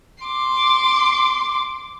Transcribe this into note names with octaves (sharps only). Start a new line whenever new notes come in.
C6 D6